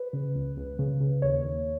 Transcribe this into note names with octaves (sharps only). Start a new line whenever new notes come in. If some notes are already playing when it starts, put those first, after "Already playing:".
Already playing: B4
C#3
C#2
C#2
C#3
C#3
D#2 C#5
D#2